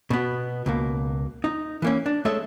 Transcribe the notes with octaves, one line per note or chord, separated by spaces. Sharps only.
B2 B3
C#2 B2 A#3
D#4
E3 A#3 C#4
D4
G#3 A3 A4 C#5 D#5 E5